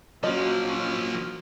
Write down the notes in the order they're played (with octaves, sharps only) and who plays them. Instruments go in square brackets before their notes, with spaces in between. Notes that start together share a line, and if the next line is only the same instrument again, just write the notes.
[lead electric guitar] F3 A#3 [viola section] F#3 C#4 F#4 [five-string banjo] D#5